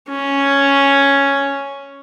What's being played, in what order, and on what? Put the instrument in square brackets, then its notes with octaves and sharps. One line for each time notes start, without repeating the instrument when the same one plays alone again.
[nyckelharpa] C#4